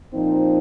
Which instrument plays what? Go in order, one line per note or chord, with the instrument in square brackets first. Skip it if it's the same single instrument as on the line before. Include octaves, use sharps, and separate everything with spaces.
[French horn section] A#2 F3 C4 D#4